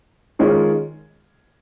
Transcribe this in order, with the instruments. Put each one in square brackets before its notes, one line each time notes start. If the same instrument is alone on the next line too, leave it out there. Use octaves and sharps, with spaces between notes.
[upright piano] D#3 G#3 C#4 F4